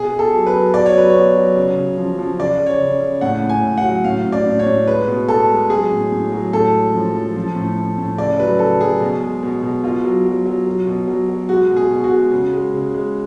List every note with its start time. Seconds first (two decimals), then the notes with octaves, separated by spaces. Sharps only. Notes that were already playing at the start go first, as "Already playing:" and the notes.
Already playing: B2 G#4
0.11 B2
0.19 A4
0.32 F#3
0.47 B4
0.53 F#3
0.74 B2 D5
0.86 C#5
0.94 F#3 B4
1.10 B2 C#5
1.35 F#3
1.56 C#3
1.76 C#3
1.98 F3
2.19 F3
2.39 C#3 D5
2.59 C#3
2.66 C#5
2.81 C#3
3.01 C#3
3.21 A2 F#5
3.43 A2
3.49 G#5
3.63 A2
3.78 F#5
3.83 F#3
4.04 A2 F5
4.26 A2
4.32 D5
4.46 A2
4.59 C#5
4.66 A2
4.87 G#3 B4
5.07 B2
5.28 B2 A4
5.49 G#3
5.70 F#3 G#4
5.91 A2
6.12 A2
6.32 F#3
6.53 A2 A4
6.73 G#3
6.94 F3
7.14 F3
7.36 F3
7.56 A2
7.77 A2
7.98 A2
8.18 C#3 D5
8.40 F#3 B4
8.59 C#3 A4
8.80 F#3 G#4
9.00 B2
9.22 G#3
9.43 B2
9.62 B2
9.84 B2 F4
10.04 F#3
10.26 F#3
10.45 F#3
10.66 F#3
10.87 B2
11.07 F#3
11.29 F#3
11.49 G#3 F#4
11.71 B2
11.76 G#4
11.90 B2
12.04 F#4
12.11 G#3
12.32 C#3
12.53 G#3
12.74 C#3
12.94 G#3